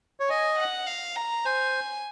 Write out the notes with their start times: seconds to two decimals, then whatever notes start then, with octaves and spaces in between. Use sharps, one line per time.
0.20 C#5
0.29 D#5 G#5
0.59 F#5
0.87 F5
1.16 A#5
1.45 C5 G#5